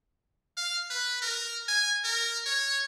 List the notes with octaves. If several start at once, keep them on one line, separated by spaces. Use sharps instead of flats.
F5
B4
A#4
G#5
A#4
C#5